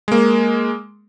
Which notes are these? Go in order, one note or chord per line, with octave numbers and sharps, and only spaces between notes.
G#3 A#3